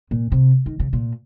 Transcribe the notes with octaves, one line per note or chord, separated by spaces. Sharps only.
A#2
C3
D#3
C#3
A#2